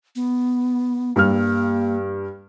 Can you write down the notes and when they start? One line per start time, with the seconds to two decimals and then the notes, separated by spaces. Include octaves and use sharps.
0.15 B3
1.16 G2 A#3 F6